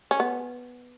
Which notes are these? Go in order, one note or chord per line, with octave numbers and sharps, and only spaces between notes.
C#4
B3